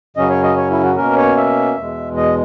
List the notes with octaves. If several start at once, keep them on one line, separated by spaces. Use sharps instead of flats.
F#2 C#3 F#3 C#4 D#5
C#5
D#5
C#5
E4
F#4
B2 A#3 C#4 A#4
C#5
E5
E2 B2 G#3
D#5